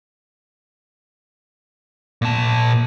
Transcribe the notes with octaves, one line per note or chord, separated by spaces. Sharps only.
A#2 A5